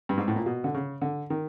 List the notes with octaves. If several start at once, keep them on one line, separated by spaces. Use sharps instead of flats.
G2
G#2
A2
A#2
B2
D3
C#3
D3
D#3